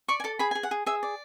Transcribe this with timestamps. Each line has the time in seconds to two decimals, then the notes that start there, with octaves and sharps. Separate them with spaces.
0.08 D5 C#6
0.20 G#5
0.24 A4 A5
0.39 G#4 B5
0.51 G#4 G#5
0.63 F#5
0.71 G#4
0.86 G#4 E5
1.03 D5